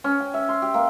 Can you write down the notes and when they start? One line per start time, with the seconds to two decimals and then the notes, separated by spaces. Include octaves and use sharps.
0.04 C#4
0.20 G5
0.34 E5
0.49 C6
0.62 G4
0.74 A#3